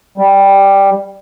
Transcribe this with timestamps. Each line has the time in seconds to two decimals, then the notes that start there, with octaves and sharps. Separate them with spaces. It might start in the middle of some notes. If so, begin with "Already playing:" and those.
0.18 G3